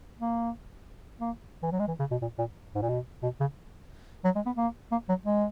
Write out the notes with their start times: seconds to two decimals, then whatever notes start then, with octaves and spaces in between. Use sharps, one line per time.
0.20 A#3
1.21 A#3
1.63 E3
1.72 F#3
1.79 G#3
1.88 E3
1.99 C#3
2.11 B2
2.22 A#2
2.38 A#2
2.75 G#2
2.82 A#2
2.89 B2
3.23 B2
3.40 C#3
4.24 F#3
4.35 G#3
4.46 B3
4.57 A#3
4.92 A#3
5.09 F#3
5.25 G#3